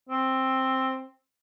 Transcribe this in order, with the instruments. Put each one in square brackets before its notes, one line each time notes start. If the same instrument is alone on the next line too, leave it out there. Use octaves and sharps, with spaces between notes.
[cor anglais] C4